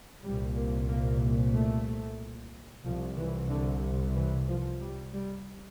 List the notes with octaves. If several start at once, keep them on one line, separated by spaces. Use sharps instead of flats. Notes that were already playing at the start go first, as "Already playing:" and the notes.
C2 A#2 G3
A#3
A#3
A3
C2 C3 F3
E3
D3
E3
F3
G3
G3